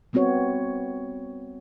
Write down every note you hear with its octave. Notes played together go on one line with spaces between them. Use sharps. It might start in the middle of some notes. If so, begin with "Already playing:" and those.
G3 B3 C4 F#4 C#5